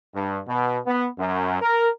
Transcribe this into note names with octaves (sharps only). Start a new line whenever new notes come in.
G2
B2
B3
F#2
A#4